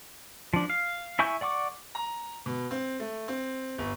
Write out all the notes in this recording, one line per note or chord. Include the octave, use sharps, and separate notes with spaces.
F3 D4
F5
E4 E5 G#5 C#6 G6
D5 F#5 C#6 D6
A#5
B2
C4
A3
C4
G1